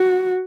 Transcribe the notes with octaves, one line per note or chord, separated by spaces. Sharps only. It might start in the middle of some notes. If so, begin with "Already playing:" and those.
Already playing: F#4